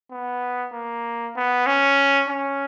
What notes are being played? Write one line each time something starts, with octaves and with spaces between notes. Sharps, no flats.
B3
A#3
B3
C#4
C#4